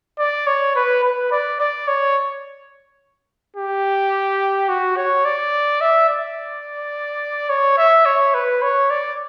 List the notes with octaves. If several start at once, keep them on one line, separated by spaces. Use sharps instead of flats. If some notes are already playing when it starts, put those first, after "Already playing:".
D5
C#5
B4
B4
D5
D5
C#5
G4
F#4
C#5
D5
E5
D5
C#5
E5
C#5
B4
C#5
D5